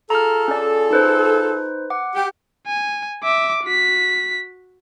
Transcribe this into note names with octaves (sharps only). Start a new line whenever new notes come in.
F4 G#4 A4 A#5 F6
C#4 D5
D#4 B4 C5
F#5 D6
G4
G#5
E5 D6
F#4 B6